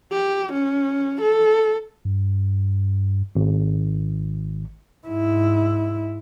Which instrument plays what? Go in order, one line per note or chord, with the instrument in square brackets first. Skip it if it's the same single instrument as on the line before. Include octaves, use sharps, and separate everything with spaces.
[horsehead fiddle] G4
C#4
A4
[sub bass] G2
[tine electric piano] G#1
[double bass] G#2 E4